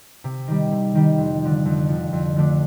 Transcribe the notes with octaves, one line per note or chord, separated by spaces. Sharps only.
C3
D#3 G3
C3
D#3 G3
F2
D3 F3
F2
D3 F3
F2
D3 F3 A3 D4